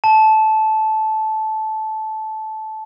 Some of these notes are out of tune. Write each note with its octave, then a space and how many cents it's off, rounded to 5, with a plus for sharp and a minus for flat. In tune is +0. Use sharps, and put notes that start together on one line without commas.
A5 -15